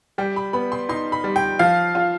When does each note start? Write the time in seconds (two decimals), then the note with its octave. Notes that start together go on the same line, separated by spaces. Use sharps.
0.18 G3 G5
0.36 B5
0.53 B3 B5
0.72 C6
0.89 D#4 C6
1.12 B5
1.24 G3
1.36 G5
1.59 F3 F5
1.95 F4